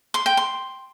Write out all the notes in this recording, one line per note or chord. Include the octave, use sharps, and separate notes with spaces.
C6
G5
C6